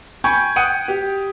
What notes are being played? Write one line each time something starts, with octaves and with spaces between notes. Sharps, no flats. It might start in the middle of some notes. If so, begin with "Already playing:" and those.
G5 G#5 B5 C#6 G6 G#6
F#5 G5 D#6 D7 D#7
G4